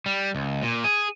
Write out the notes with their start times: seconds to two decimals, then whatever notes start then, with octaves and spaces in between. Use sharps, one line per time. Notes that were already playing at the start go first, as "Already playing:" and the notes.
0.06 G3
0.35 C#2
0.63 A#2
0.84 G#4